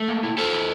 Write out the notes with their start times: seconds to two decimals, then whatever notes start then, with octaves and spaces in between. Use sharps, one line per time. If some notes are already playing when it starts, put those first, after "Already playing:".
Already playing: A3
0.08 A#3
0.23 E4
0.38 E4 A4 C5
0.53 E4